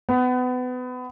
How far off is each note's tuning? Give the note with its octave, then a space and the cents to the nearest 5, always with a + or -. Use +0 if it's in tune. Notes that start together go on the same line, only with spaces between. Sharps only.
B3 +30